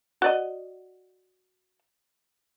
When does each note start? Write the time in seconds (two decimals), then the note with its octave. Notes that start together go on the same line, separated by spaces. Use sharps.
0.22 F#4 D5 D#5